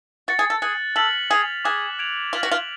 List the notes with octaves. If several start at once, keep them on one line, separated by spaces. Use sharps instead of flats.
F#4 F#6 A6 C#7
G#4
A4
G#4 F#6 C#7 F#7
A4 F6 B6 F#7
G#4 F#6 C#7 F7
G#4 D6 F#6 B6
G#6 D7 F7
F4 D6 F6 B6 F#7
F#4
F4